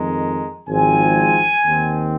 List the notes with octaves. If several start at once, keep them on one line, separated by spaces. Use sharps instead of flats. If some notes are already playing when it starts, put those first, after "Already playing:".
Already playing: F2 D#3 G#3 A#5
G#1 G#2 F3 C4 G#5
D#2 D#3 C4